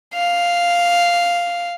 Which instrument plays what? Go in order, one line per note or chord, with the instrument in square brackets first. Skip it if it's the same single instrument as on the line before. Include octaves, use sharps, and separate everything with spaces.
[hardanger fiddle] F5